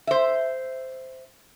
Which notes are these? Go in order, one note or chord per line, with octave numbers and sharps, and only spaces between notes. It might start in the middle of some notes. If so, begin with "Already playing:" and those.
C5 E5